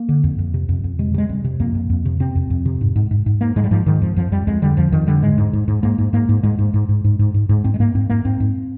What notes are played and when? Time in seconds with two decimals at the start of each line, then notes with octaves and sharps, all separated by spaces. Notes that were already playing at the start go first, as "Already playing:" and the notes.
Already playing: A#3
0.09 D3
0.24 F2
0.39 F2
0.54 C3
0.69 F2
0.84 F2
0.99 C3 G#3
1.14 C3 G#3
1.29 F2 G3
1.44 C3
1.60 F2 A#3
1.75 F2
1.90 F2
2.05 C3
2.20 C3 C4
2.35 F2
2.50 F2
2.66 C3
2.81 G#2
2.96 G#2
3.11 G#2
3.26 G#2
3.41 G#2 A#3
3.56 G#2 G#3
3.64 G3
3.71 G#2 F3
3.86 G#2 D#3
4.01 F2 F3
4.16 F2 F3
4.32 F2 G3
4.47 F2 G#3
4.62 D3 G3
4.77 F2 F3
4.92 F2 D#3
5.07 D3 G3
5.22 G#2 G#3
5.38 G#2
5.53 G#2
5.68 G#2
5.83 G#2 A#3
5.98 G#2
6.13 G#2 A#3
6.29 G#2
6.43 G#2 G#3
6.59 G#2
6.74 G#2
6.89 G#2
7.04 G#2
7.19 G#2
7.34 G#2
7.49 G#2
7.64 G#2 C4
7.74 G#3
7.80 G#2 A#3
7.95 G#2 C4
8.10 G#2 A#3
8.25 G#2 C4
8.40 G#2